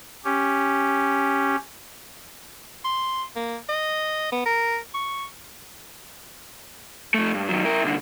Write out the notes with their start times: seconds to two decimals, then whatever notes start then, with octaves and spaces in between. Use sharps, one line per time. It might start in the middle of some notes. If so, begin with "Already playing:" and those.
0.25 C#4 G4
2.84 C6
3.36 A#3
3.69 D#5
4.32 B3
4.46 A#4
4.94 C#6
7.14 F2 A3
7.35 G2
7.49 D#3 F#3
7.65 E4 A#4
7.84 C2 D3